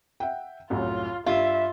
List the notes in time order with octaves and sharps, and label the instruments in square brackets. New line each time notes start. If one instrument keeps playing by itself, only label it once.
[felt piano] E5 F#5 G5
[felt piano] C2 F#2 A2 [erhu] F4
[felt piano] G2 [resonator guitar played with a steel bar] F4 [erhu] E5